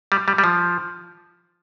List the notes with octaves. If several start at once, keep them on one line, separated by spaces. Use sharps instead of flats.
G3
G3
G3
F3